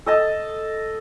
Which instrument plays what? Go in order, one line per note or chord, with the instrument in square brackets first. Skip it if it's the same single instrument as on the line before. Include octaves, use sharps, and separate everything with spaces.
[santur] A4 D#5 A5